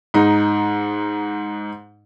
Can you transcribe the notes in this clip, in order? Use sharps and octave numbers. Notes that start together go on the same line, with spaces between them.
G#2 D#4